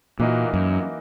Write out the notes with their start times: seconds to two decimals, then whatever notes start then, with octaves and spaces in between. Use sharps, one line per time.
0.19 A#2 E3 A#3 D#4 F#4
0.54 F#2